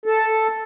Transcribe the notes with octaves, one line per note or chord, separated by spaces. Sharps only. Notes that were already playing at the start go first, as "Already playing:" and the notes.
A4